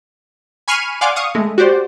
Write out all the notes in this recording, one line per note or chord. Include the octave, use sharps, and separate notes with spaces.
G#5 B5 C#6 F6 C7 D#7
D5 F5 F#5 G#5 C6 D6
F5 C#6 D#6
G#3 A3
F#4 G4 C5 D5